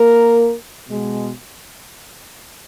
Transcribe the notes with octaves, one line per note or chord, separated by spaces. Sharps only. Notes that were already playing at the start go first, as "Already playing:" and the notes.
Already playing: A#3 A#4
B2 G#3